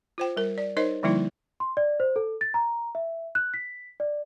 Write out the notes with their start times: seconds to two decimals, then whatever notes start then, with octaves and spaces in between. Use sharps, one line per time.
0.18 F4 C5 G5
0.37 G3 A#4
0.58 D5
0.77 D#4 A#4 C5 C#5 D#5
1.03 D3 F3 G3 A#3 D#4 E4
1.60 C6
1.77 D5
2.00 C5
2.16 A4
2.41 A6
2.54 A#5
2.95 E5
3.35 F#6
3.54 B6
4.00 D5